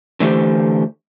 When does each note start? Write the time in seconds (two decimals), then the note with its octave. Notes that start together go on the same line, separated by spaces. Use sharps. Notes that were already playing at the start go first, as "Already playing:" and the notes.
0.20 D3 E3 A3 G4 C5